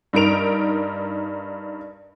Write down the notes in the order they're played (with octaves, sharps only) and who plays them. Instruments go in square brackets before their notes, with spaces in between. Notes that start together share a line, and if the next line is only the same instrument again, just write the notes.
[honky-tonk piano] G2 D#4 A#4 D7 F7